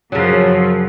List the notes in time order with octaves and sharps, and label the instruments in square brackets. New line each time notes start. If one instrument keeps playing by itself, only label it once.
[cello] F#2 F3 [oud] C#3 F#3